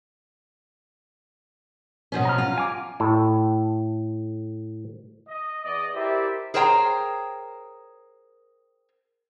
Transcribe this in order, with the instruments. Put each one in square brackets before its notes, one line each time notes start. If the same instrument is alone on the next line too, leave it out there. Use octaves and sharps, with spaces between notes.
[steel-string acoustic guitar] B2 F3 C#4
[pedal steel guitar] A#5 F6
[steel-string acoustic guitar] F4
[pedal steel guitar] G#5 D6
[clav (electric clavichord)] A2 A4
[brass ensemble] D#5
E2 D5 D#5
E4 G4 A#4 C5 D5 E5
[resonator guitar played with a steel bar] G#4 A#4 C5 C#5 G5 A#5